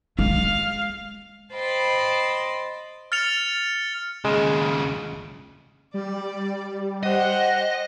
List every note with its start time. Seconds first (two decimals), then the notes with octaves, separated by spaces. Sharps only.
0.19 G#3 F5
1.53 C5 D#5 G5 A5 B5 C6
3.12 F6 A6 C#7 F7
4.25 D#2 C#3 G#3
5.94 G3 D5
7.03 G4 C5 D#5 F#5